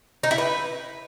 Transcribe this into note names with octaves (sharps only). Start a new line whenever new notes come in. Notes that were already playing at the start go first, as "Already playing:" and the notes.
D#4
E4
B4